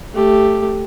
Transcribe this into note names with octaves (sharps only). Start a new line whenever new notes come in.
A3 G4